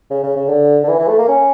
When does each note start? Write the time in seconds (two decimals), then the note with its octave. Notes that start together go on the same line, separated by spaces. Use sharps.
0.10 C#3
0.23 C#3
0.37 C#3
0.49 D3
0.84 D3
0.89 E3
0.99 E3
1.08 A3
1.19 A#3
1.28 C#4